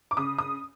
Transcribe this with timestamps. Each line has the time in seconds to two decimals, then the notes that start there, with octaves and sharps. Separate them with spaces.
0.11 D6
0.17 C#3 D#6
0.38 D#6